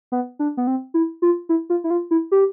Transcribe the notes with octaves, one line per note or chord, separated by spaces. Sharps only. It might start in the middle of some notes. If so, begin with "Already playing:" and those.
B3
D4
B3
C4
E4
F4
E4
F4
E4
F4
E4
G4